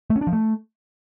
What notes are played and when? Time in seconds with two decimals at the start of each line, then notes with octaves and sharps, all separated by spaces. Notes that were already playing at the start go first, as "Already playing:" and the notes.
0.10 A3
0.16 C#4
0.21 D4
0.27 F3
0.33 A3